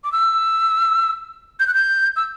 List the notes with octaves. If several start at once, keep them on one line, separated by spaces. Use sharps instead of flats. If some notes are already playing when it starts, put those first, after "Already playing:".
D6
E6
G6
F#6
G6
E6